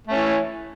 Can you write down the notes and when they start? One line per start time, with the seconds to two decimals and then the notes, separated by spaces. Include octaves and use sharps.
0.07 A3
0.11 C#4
0.15 E3